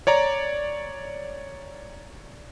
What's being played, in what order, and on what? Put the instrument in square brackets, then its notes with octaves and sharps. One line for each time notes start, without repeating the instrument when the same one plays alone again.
[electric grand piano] C#5 D5 A#5